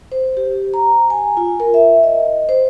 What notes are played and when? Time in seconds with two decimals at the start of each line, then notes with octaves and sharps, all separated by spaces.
0.12 C5
0.37 G4
0.74 A#5
1.10 G#5
1.37 F4
1.60 A#4
1.74 E5
2.03 D#5
2.49 C5